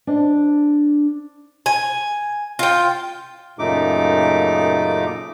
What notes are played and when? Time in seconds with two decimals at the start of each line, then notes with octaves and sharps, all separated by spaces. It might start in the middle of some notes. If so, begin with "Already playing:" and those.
0.07 D4 C5 D#5
1.66 G#5
2.59 F4 G5
3.59 F#2 A#2 C#3 A3 D#4 D6